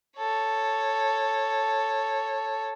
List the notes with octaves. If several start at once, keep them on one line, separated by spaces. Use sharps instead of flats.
A4 C#5